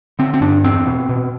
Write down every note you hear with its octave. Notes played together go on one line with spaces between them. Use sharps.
D3 C4
C4
G2 D4
E2 C4
B2
B2